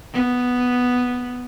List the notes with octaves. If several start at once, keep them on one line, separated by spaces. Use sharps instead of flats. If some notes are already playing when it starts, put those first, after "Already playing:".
B3